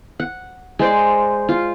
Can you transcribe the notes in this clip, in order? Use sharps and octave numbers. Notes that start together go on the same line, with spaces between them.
F#5
G#3 C5 D5
F4